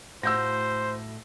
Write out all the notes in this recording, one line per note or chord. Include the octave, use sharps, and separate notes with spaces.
A2 F4 F#4 C5 E6 G6 A#6